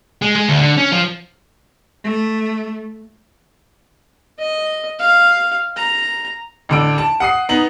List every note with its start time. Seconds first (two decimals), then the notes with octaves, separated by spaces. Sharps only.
0.22 G#3
0.36 G#3
0.49 D2
0.61 D3
0.77 C#4
0.92 F3
2.04 A3
4.39 D#5
4.99 F5
5.76 A#5
6.69 A1 D3 D7
6.98 A5
7.20 F#5 D#6 C7
7.49 B3 D#4 F#7